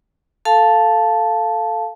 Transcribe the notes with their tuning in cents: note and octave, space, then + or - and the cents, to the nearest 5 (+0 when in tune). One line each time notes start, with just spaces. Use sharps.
A4 +0 F5 +0 A5 -5